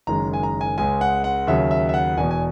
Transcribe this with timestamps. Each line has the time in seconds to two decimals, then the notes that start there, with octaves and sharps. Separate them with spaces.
0.07 F#1 F#2 D#3 G#3 A#5
0.33 G#5
0.43 A#5
0.61 G#5
0.78 C#2 C#3 G#3 G#5
1.01 F#5
1.24 F#5
1.47 D#2 C#3 F#3 E5
1.71 E5
1.89 E5
1.94 F#5
2.17 E1 E2 B2 G#5
2.31 G#5